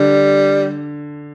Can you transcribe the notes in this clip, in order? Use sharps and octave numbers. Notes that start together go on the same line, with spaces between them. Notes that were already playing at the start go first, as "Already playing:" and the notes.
Already playing: D3 G3